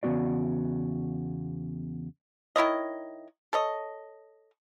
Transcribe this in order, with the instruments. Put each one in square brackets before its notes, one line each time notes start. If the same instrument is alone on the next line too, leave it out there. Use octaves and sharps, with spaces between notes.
[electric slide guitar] E2 C#3 G3 B3 F#4 D5
[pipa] D#3 E4 C#5 D#5
A4 C#5 D#5